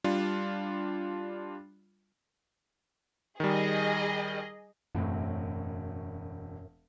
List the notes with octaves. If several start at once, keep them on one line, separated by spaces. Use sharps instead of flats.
G3 D4 F4
D#3 G3 G#4 D#5
E1 F#2 A2 C4